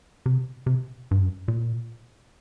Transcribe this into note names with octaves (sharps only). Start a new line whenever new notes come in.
C3
C3
G2
F#2
A#2